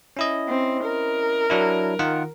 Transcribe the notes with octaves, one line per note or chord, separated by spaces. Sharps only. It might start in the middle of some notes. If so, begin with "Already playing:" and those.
C#4 E4 D#5
C4
A#4
F#3 D4 E4
D#3 F4 F#5